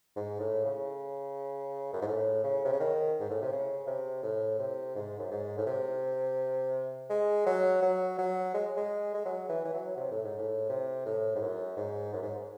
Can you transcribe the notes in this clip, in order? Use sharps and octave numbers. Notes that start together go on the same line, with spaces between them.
G#2
A2
C#3
F#2
G#2
A2
C#3
C3
C#3
D#3
G#2
A2
C3
C#3
C3
A2
C3
G#2
F#2
G#2
A2
C3
G#3
F#3
F#3
F#3
G#3
G#3
G#3
F#3
E3
E3
F#3
C3
A2
G#2
A2
C3
A2
G#2
F#2
G#2
F#2
G#2